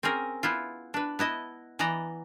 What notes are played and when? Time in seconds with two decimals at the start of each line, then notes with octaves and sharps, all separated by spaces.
0.03 C4 C#4 G#4 A#4
0.43 B3 E4 F4
0.94 D4 B4
1.19 B3 E4 D#5 A5
1.79 E3 B3 D5 D#5 A#5